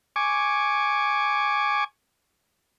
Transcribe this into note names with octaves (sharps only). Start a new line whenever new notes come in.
G#5 C#6 D6